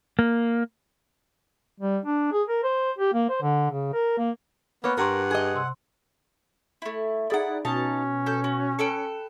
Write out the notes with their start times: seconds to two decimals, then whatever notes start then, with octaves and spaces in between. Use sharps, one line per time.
0.19 A#3
1.80 G3
2.05 D4
2.32 G#4
2.48 A#4
2.63 C5
2.98 G4
3.13 A#3
3.29 C5
3.42 D3
3.71 C#3
3.93 A#4
4.18 A#3
4.84 A#3 B3 C#5 F6
4.97 G2 A#4 F#5 A#5 C6 C#6
5.31 G#4 D#5
5.54 C3 C6 E6
6.82 A3 E4
7.30 D#4 E4 G#4 D5 F#5
7.65 B2 C#4 D#4 F5 A5
8.26 A4 G6
8.44 F#4
8.79 A4 B4 G5 C#7